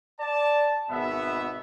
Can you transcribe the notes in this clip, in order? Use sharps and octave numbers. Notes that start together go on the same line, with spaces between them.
D5 A5
G#1 B2 B3 E5